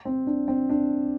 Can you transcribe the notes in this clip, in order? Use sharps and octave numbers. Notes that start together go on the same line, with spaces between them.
C4
D4
C4
D4